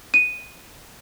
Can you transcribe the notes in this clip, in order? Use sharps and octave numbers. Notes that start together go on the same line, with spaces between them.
D#7